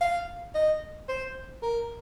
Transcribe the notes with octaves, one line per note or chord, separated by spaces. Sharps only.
F5
D#5
C5
A#4